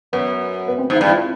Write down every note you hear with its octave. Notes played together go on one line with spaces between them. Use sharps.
F#2 B3
B3
C4
G#2
E4
G2
F4